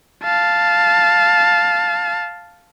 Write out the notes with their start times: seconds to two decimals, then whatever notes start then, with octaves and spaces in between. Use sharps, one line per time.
0.23 F5 A5